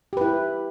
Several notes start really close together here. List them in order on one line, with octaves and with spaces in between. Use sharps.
G4 B4 E4